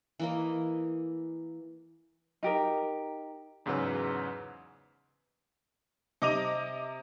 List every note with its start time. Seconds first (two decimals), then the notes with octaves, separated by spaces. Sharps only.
0.20 E3 A#3 D#5
2.43 D#4 G4 A#4
3.66 E2 G#2 C#3 F#3 B4 E6
6.22 C3 D#5 D6 D#7 F7